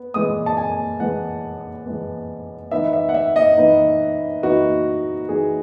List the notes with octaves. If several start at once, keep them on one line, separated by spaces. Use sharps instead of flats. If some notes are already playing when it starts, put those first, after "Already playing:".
Already playing: B3
E3 G#3 B3 D#6
A5
G#5
E3 G#3 B3 F#5
E3 G#3 B3
E3 B3 D#4 E5
E5
F#5
E5
D#5
E3 B3 D#4
E3 B3 D#4 F#4
E3 B3 D#4 G#4